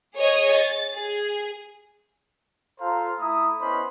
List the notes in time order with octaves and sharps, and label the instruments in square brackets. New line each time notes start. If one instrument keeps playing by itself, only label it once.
[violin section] G#4 C#5 D#5 D#6
A6
G#4
[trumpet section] F4 A4 C5 F5 A#5
A3 E4 A#5 D#6
B3 C#4 E4 C5 D#5 B5